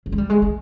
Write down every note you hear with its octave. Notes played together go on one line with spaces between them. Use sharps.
F#3
G#3
G3
G#3
A3